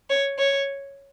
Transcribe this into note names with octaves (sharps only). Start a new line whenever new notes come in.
C#5
C#5